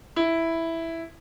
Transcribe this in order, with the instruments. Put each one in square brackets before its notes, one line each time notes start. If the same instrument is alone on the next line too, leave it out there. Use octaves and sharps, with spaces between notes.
[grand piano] E4